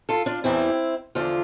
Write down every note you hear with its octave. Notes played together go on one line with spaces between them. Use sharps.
F4 A4
D4 F4
E2 E3 G3 C4 E4
E2 D3 F3 D4 F4